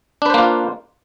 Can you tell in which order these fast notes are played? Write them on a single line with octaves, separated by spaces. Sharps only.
D4 B4 C5 A#3 F4